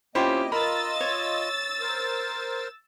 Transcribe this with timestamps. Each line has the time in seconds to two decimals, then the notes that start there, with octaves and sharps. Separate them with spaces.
0.15 A#3 C4 C#4 E4 F4 G4 C5 D#5
0.52 F4 A#4 D#5 B5 E6 A6
1.01 C#5
1.81 A#4 C5